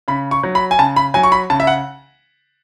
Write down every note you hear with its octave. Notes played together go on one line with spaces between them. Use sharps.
C#3 B5
C#6
F#3
B5
G#5
C#3 A5
B5
F#3 G#5
C#6
B5
C#3 A5
E5
F#5